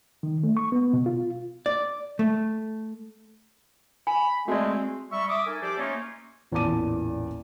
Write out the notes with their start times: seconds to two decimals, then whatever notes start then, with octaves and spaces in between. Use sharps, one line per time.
0.23 D#3
0.43 A3
0.57 C#6
0.72 B3
0.93 B2
1.06 F4
1.66 D5
2.19 A3
4.07 G#5 B5
4.48 G#3 A3 C4 F#4 D5
5.11 G3 E5 C#6
5.30 E5 D6 D#6
5.47 D#4 A4 A#4 G#5
5.62 F3 G4 C5 D5 E5 D6
5.78 A3 A#3 C#4 D#4 F4 C#5
6.52 A1 E2 A#2 A5 D6 D#7